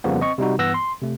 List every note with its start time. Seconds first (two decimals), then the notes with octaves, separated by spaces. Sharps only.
0.04 F2 C#3 F3 G3 A#3 B3
0.20 C4 D#5 C#6
0.38 C3 G3 D#4 F#4
0.58 G2 E3 B3 E6 F#6 A#6
0.74 C6
1.02 C3 A3